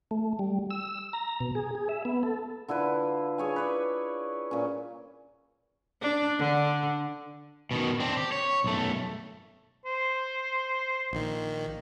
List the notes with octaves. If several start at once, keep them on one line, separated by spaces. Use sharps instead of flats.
A3
G3
E6
A#5
B2
G#4
G#4
E5
B3
A4
D3 E4 F4 B4
G#4 C#5 G#5
B4 C#5 D5
A#2 C#4
D4
D3
B2 D#3
C4 D4
G4
C#5
B1 A3
C5
A#1 D#3